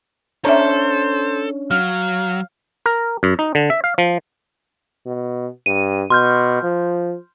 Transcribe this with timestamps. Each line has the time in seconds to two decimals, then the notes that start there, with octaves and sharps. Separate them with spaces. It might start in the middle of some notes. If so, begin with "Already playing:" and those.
0.45 C#4 D4 A4 C5 C#5 E5 A#5
1.71 F#3 F5 F6
2.86 A#4
3.23 F#2
3.39 D#4
3.55 D3
3.70 E5
3.84 F5
3.98 F3
5.06 B2
5.66 G2 D#7
6.10 B2 C6 F6 G6
6.63 F3